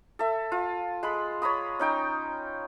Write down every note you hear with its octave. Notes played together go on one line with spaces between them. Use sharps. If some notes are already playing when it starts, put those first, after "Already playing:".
A4 E5
F4
G#3 B5
C#5 A#5 B5 D#6
C#4 D#4 G5